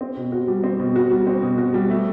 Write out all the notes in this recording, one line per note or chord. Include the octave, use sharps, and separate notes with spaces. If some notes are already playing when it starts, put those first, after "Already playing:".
C4
B2
F#4
G3
C4
B2
F#4
G3
C4
B2
F#4
G3
A3